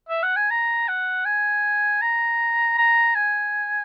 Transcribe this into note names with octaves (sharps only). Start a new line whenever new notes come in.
E5
F#5
G#5
A#5
F#5
G#5
A#5
A#5
G#5